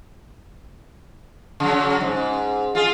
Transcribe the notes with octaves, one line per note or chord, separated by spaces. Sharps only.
C#3 F#3
G#2
F4 G#4